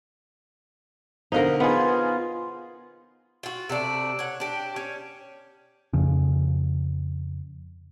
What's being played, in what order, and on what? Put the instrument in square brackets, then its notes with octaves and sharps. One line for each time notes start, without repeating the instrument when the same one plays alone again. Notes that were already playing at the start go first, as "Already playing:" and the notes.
[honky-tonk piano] B2 D3 A#3 [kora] D#4 A#4 [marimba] C5 F5 A#5
[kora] B3 [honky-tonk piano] D#4 G#4 [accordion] F4
[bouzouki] F4 F#4
C3 A3 D4
C#5 F#5
D4 G4
C#4
[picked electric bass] F2 C#3